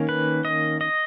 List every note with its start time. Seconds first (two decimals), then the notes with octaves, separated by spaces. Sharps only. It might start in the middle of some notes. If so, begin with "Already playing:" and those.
Already playing: D#3 A#3 C#4
0.09 B4
0.45 D#5
0.81 D#5